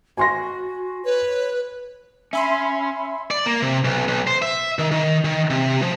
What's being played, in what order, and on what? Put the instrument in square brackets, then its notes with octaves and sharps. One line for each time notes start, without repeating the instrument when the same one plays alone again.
[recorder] F#4 [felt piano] G#5 C6 A#6
[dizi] B4 [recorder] C#5
[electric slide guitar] C#4 [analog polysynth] E5 B5 C6
[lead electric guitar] D5
A#3
C3
B1
B1
C5
E5
D#3
D#3
D#3
C3
F3